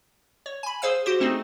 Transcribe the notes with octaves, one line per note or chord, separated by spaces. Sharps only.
C#5
G#5 B5
G#4 C5 F5 E6
F#4 G4 C5
A3 C4 D#4 G#4